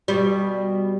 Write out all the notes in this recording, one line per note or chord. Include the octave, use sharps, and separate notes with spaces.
B2 G3